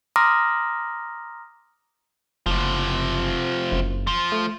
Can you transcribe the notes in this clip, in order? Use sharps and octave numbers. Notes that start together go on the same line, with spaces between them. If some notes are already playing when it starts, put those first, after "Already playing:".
A#5 C6 D6 D#6 F6 A#6
F#1 C3 F3
F#1
F3
A3